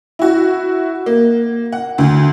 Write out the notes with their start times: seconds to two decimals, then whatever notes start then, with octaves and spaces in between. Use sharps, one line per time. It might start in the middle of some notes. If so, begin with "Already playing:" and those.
0.19 E4 F#4
1.06 A#3
1.72 F#5
1.98 D2